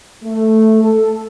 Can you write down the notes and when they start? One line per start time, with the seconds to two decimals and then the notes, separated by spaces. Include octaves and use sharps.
0.24 A3
0.82 A4